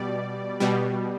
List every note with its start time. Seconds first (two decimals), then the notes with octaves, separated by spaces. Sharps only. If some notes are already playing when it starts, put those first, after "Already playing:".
Already playing: B2 G3 D5
0.60 B2 G3